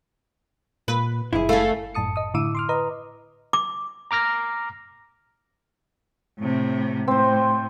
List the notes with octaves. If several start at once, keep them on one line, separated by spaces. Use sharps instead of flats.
A#2 B4
F#1 F2 E4 G#4
A3 C#4 A4 F5
G1 F#2 A2 A5 D#6 C#7
D#5 D#6
A2 D3 E4 D6 E6 D#7
C6 D6 F6
B4 D#5 A#5 D#6
D6
A#5 D6 F6 A#6
A2 C3
A2 C4 C5